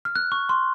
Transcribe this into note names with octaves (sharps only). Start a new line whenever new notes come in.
F6
F#6
C#6
C6